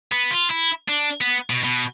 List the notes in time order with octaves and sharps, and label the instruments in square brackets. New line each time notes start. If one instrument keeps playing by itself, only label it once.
[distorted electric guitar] B3
F4
E4
D4
B3
B2
B2